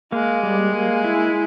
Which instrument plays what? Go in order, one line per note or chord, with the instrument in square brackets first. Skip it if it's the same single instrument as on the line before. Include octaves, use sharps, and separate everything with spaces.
[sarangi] G#3 [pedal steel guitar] A#3
[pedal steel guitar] G3
A#3
E4